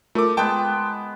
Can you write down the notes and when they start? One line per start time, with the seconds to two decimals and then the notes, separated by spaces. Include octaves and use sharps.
0.15 A3 F4 A#4 D6
0.37 G#3 B3 G5 A5